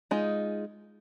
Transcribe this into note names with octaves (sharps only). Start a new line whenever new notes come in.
G#3 D#4 F4